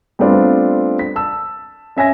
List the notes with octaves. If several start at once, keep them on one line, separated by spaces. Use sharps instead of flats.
G3 A3 B3 C4 D4 F4
B6
A5 E6
C#4 E5 G#5 A#6